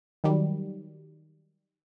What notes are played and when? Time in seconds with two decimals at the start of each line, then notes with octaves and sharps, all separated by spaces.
0.24 D#3 F#3 G3